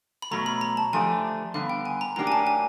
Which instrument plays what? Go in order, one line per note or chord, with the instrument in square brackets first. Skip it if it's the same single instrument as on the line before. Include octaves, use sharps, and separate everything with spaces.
[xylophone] B5
[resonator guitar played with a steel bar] B2 F#3 A3 [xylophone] A#5
[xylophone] B5
A#5
A5
[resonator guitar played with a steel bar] D3 F3 A3 D4 G4 [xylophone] G#5
[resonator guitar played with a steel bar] D3 G3 B3 [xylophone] F5
[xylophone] G5
G#5
A#5
[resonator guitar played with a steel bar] A2 F#3 A#3 D4 G4 [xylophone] A#5
[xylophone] G#5
A5
G#5